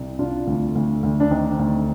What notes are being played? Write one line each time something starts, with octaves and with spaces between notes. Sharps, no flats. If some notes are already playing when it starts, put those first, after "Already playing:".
Already playing: C2
C3 D4 F4
D2
D2
D2
D4
D#3 C4 D#4
D2